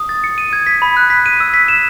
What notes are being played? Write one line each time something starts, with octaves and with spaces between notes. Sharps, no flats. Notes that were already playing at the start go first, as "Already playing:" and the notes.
Already playing: D#6
A6
C#7
D#7
G#6
B6
B5
F#6
B6
D#7
E6
B6
E7